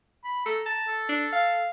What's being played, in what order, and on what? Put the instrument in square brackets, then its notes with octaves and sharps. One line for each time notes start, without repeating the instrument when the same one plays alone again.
[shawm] B5
[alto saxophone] A4 [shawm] A#5
[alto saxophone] A5
[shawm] A4
[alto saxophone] D4
F5